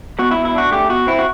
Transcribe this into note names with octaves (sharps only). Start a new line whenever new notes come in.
B2 F#4
E4
B2
E4
D4 F#4
A3 G4
B2 F#4
C4 E4
F#4